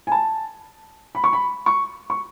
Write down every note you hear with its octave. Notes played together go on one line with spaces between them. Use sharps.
G#5
A5
B5
C#6
B5
C#6
C#6